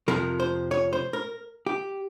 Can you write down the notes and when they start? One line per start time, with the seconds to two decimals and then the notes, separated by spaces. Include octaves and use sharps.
0.08 F2 C3 F3 A#4
0.40 C5
0.71 C#5
0.93 C5
1.13 A#4
1.67 G4